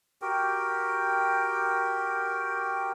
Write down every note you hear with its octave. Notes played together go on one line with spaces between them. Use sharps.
F#4 G4 A#4 G5